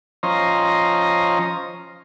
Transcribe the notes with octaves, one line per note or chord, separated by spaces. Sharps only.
F3 C#4 C5 D#5 A#5